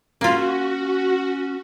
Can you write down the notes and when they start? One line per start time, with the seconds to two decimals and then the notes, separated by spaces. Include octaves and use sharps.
0.21 A#3 C#4 F4 F#4